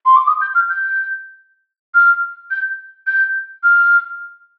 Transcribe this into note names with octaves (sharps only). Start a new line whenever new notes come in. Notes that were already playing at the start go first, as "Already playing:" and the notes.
C6
D6
D#6
G6
F6
G6
F6
G6
G6
F6